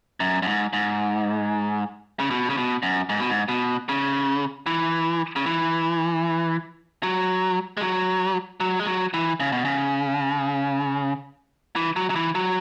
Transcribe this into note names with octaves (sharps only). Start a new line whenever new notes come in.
F#2
F#2
G#2
G#2
C#3
B2
C#3
B2
F#2
G#2
B2
G#2
B2
C#3
E3
C#3
E3
F#3
G#3
F#3
F#3
G#3
F#3
E3
C#3
B2
C#3
E3
F#3
F#3
E3
F#3